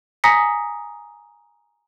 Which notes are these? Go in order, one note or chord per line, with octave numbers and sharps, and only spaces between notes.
G#5 A#5 D#6 A#6 B6 C#7